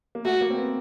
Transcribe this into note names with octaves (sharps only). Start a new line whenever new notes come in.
A#3
A3 F#4
A#3
C4
B3